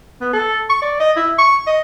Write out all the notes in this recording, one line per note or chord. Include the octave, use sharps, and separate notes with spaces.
B3
A4
C#6
D5
D#5
E4
C#6
D#5